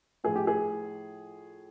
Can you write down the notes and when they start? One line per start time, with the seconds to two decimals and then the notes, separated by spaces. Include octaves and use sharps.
0.24 A2 F3 G#4
0.36 G4
0.47 G#4